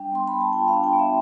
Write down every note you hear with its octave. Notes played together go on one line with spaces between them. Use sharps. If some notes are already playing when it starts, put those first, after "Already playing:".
Already playing: G3 D4 G5
B3 C6
B3 B5
A5
F4 G5
F5
D4
G5
B3
E5